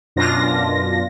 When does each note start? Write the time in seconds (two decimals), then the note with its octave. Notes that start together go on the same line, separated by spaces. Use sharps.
0.16 F#2 B2 D4 F4 A#6